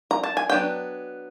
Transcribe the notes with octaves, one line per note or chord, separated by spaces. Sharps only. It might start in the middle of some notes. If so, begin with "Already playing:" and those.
A#5
A5
G#5
F#3 B3 D4 G5